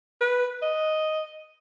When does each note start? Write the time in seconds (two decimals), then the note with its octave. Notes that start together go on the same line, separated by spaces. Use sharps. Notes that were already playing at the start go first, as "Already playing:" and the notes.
0.21 B4
0.62 D#5